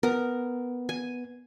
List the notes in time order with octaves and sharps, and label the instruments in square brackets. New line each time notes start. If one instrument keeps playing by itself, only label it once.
[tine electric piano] B3 [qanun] A#4 A#5
[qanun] G#5